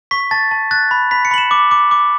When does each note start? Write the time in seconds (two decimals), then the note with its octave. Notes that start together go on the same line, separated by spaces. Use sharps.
0.11 C#6 B6
0.31 A5 A6
0.51 A5
0.71 F#6 A6
0.91 B5
1.11 B5 B6
1.25 C#7
1.31 B5 F#7
1.38 E7
1.51 D6
1.71 D6
1.91 D6